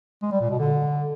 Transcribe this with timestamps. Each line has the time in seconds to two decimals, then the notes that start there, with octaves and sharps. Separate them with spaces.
0.22 G#3
0.32 G3
0.41 A#2
0.50 B2
0.59 D3